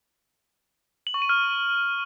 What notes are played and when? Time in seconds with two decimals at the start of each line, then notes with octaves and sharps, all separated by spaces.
1.07 F#7
1.14 C#6
1.22 D#7
1.29 F6